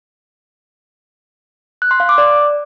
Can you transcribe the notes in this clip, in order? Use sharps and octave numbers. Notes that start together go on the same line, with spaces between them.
F#6
C6
F5
D6
D5